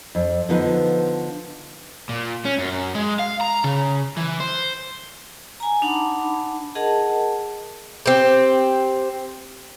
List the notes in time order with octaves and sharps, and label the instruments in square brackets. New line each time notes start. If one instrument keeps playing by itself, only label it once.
[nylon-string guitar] F2
D3 F3 B3 D#4 B4
[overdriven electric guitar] A#2
C#4
F#2
G#3
F5
A#5
C#3
E3
C5
[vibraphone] G#5 A#5
D4 D#4 F#5 A5 B5 D6
G#4 A#4 D#5 F#5 A5
[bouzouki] C4 G4